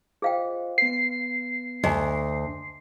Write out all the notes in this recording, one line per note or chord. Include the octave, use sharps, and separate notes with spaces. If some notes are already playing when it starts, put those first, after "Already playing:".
F4 G#4 C5 D#5 F5 G5
B3 B4 C7
D2 D#5 G#5 C6